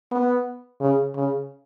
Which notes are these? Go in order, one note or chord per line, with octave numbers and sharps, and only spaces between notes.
B3
C#3
C#3